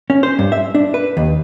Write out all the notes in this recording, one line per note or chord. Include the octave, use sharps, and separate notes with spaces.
C#4
C5
G2
E5
D4
B4
D#2